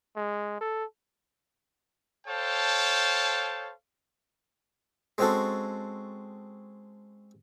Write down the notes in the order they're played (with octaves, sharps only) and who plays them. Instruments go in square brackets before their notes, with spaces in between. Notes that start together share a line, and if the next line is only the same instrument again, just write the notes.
[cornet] G#3
A4
[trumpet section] A4 C5 C#5 F5 G5 A5
[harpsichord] G#3 C4 C#4 F#4 A4